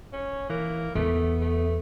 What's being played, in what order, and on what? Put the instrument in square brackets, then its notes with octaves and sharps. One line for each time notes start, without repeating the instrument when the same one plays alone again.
[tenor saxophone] C#4
[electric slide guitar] E3 [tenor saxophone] A#3
[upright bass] E2 [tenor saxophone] A3 [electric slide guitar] B3
[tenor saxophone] A3